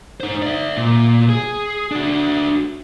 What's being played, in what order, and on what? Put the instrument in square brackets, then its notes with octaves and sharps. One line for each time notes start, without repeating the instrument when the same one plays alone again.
[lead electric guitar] D#4 C5
D5 E5
A#2
G#4
D4 F#4